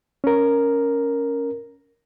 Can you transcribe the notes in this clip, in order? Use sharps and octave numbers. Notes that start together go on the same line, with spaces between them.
C#4 A#4